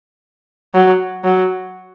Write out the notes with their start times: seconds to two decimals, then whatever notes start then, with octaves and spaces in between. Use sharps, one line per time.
0.74 F#3
1.24 F#3